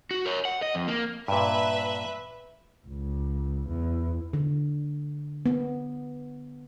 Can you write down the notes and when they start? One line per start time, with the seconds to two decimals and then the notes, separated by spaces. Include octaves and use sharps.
0.11 F#4
0.26 A#4 C#5
0.45 F#5
0.62 D#5
0.75 F2
0.88 A#3
1.28 G2 A#2 B4 E5
2.87 C#2
3.68 E2
4.33 D3
5.46 B3